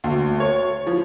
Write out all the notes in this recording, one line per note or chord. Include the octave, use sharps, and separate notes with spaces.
D2
C#5
F3